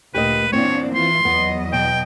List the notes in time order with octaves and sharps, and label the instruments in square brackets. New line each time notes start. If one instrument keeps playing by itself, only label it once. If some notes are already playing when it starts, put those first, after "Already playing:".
[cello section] D2 A#2 A#3 [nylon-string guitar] G4 A#4 D#5 [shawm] B4
[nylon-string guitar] E2 C4 [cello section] A#2 A#3 D4 [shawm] C#5
[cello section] E3 F4 [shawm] C6
[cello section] E2 F#3 D#5 [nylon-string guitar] B3
[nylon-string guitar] B2 [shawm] G5